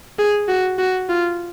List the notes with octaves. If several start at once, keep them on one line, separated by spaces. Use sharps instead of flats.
G#4
F#4
F#4
F4